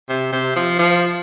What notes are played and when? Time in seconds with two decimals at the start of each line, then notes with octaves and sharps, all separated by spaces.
0.09 C3
0.32 C3
0.56 F3
0.79 F3